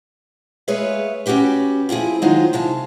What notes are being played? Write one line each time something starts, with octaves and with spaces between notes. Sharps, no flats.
G#3 G#4 B4 C#5 E5 F5
C#4 D#4 F#4 G4 B4
F3 C4 E4 G#4
D#3 F#3 G#3 D#4 F4 C5
C3 G#3 F5 A5